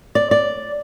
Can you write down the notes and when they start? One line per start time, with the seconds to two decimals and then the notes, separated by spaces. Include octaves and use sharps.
0.15 D5
0.31 D5